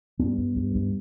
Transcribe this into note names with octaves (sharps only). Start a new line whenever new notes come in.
G2 B3
G2
G2
G2